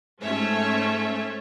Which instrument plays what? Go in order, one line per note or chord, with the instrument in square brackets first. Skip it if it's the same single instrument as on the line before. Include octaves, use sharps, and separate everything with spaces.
[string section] G#2 A3 C#4 C5 C#5 E5